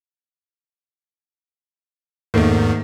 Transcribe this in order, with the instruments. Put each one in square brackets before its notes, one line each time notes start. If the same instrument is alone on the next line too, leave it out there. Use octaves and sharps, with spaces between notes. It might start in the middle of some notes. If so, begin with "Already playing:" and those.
[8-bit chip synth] E2 G#2 [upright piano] D#3 A3 A#3